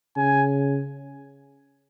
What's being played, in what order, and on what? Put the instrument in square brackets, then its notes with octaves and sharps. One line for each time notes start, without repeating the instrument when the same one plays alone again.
[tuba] C#3 [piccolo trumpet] G#5